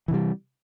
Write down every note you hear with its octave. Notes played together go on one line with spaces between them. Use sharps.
C3 E3 G3